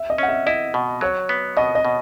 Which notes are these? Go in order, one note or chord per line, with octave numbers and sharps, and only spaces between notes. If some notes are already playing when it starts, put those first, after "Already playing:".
Already playing: E5
D#5
C#4 F#5
E5
E4 D#5
B2
F#3 C#5
B3
B2 D#5
D#5
B2